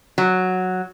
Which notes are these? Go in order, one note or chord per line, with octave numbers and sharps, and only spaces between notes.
F#3